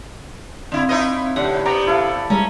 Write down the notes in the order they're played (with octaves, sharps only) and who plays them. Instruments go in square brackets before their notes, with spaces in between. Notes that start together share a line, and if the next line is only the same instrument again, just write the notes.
[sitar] D3 E4 [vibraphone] C4 F5
[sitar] D#4 C#5 D#5 [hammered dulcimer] E4 B4
[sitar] A2 D3 [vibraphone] G4 [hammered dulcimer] F#5
[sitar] C3 B3 [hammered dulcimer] D5 [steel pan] A#5
[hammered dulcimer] E4 A4 F5
[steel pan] G3 G#3 [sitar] C#4 [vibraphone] A#5